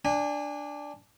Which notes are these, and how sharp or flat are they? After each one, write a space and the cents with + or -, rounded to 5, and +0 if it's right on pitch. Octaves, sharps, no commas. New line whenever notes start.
D4 +0 G#5 -30